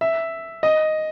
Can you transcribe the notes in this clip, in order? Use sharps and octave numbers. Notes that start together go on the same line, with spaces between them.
E5
D#5